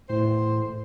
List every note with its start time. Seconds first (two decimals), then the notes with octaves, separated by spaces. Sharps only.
0.10 E2 A2 C5